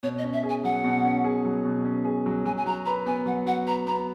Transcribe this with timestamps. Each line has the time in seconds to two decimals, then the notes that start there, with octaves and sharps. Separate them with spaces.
0.03 B2 C#5
0.18 D#5
0.24 C#4
0.33 E5
0.43 G#4
0.49 G#5
0.64 F#3 F#5
0.84 B2
1.05 C#4
1.24 G#4
1.45 F#3
1.65 B2
1.85 C#4
2.05 G#4
2.26 F#3
2.45 F#3 G#5
2.57 G#5
2.66 F#4 A#5
2.86 B4 A#5
3.06 B3 G#5
3.26 F#3 F#5
3.46 F#4 F#5
3.67 B4 A#5
3.87 B3 A#5